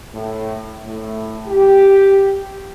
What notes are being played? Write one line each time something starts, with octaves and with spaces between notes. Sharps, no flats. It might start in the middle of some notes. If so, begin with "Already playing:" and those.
A2
A2
G4